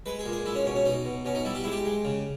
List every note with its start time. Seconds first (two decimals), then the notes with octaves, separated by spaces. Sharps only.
0.06 G#3 B4
0.19 G#4
0.26 A#2
0.32 G#4
0.46 G#3 E4
0.55 C#4
0.65 B2 C#4
0.75 C#4
0.85 B2 D#4
1.05 B2
1.25 B2 C#4
1.35 D#4
1.45 G3 E4
1.55 G4
1.64 G#3 E4
1.72 G4
1.85 G#3
2.05 C#3